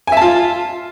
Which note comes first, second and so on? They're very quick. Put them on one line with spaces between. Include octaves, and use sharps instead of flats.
G#5 E5 A5 F4